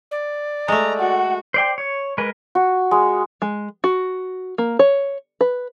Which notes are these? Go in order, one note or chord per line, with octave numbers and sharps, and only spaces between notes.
D5
G#3 A3 A#5
F#4 F#5
C5 D5 G5
C#5
G#3 A#4 B4
F#4
G#3
G#3
F#4
A#3
C#5
B4